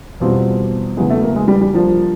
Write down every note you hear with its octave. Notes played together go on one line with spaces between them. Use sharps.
E2 B2 G3 C4 F4
E2 C#3 F#3 G#3 B3 E4
A3
A#3
G#3
G3
G3
F3 G3 A#3 D4